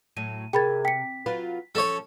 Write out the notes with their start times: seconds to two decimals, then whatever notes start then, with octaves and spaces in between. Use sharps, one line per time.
0.17 A2 F#3 D#7
0.53 C3 G#4 A#4 G5 B5 G#6 A6
0.85 G5 B6 C#7
1.26 F#3 F4 B4
1.75 F3 C#4 A4 C#5